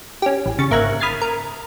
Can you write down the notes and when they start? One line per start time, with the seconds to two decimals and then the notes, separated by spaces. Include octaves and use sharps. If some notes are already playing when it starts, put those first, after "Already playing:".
0.22 C#4 G4
0.46 A1
0.59 C#3 C#6 A6
0.71 G#1 A#3 E5 A#5 F#6 G#6
1.00 B5 D#6 F6 G#6 A6 C7
1.22 A#4